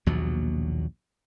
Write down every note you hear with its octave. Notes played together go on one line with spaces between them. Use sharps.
A#1 D#2 B2 F#3